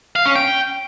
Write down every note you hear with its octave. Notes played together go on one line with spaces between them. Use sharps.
F5
C#4
G5